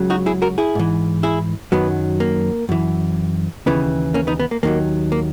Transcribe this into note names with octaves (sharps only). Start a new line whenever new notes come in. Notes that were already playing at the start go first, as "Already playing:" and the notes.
Already playing: C#2 C#3 F#3
D#4 F#4
E4 G#4
F#4 A#4
E4 G#4
G#2 E3
E4 G#4
F#2 D#3 F#3 B3
A#3
F#2 E3
D#2 C#3 E3 B3
A#3 C#4
B3 D#4
B3
A#3
D#2 D#3 F#3 A#3
A#3